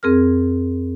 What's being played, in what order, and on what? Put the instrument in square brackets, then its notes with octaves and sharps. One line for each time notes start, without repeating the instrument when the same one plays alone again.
[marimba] F2 C4 G#4 A#4 F6